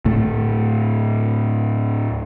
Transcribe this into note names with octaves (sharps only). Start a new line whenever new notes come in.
D2 A2 A3